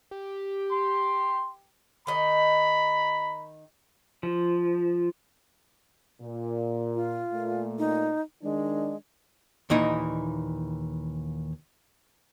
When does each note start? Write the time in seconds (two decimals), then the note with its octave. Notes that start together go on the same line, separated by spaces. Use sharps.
0.11 G4
0.71 C6
2.07 D#3 D#5 A#5 B5
4.23 F3
6.21 A#2
6.95 F4
7.32 A#2 A3
7.78 D#4
8.43 D#3 G#3 D4
9.70 D#2 A#2 E3 D#4 E4 D#5